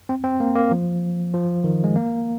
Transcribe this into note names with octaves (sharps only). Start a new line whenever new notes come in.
C4
C4
A#3
A#3
F3
F3
D#3
G#3
A#3